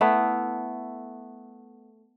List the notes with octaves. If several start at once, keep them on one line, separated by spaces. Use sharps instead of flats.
A3 B3 E4